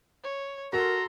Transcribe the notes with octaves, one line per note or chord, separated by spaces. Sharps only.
C#5
F#4 A4 A#4 A#5 C6